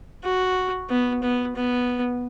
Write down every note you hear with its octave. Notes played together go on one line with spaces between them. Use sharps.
F#4
B3
B3
B3